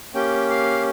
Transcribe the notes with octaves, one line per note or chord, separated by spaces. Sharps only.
A#3 C#4 G4 G5
F5